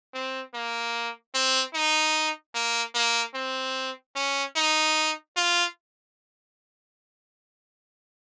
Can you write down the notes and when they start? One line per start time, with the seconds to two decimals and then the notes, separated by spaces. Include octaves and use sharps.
0.14 C4
0.54 A#3
1.34 C4
1.74 D#4
2.54 A#3
2.94 A#3
3.34 C4
4.16 C#4
4.56 D#4
5.36 F4